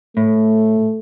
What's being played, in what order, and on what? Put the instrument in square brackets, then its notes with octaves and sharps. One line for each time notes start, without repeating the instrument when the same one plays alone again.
[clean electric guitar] A2 [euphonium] A3